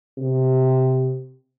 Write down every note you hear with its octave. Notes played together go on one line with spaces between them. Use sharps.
C3